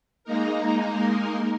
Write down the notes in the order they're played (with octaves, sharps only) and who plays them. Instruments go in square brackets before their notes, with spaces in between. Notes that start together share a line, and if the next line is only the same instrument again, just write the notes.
[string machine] G#3 A#3 D#4 A#4